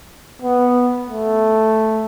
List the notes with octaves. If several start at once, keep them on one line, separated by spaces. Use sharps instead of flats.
B3
A3